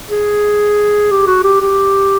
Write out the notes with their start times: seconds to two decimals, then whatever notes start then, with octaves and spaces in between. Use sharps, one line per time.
0.10 G#4
1.11 G4
1.27 F#4
1.44 G4
1.61 G4